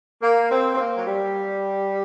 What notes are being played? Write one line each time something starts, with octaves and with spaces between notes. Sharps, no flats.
A#3
C4
C4
A#3
F#3
G3